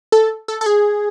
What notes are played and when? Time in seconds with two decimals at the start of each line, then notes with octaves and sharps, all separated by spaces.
0.12 A4
0.48 A4
0.61 A4
0.66 G#4